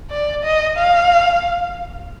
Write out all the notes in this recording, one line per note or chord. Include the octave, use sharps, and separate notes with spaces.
D5
D#5
F5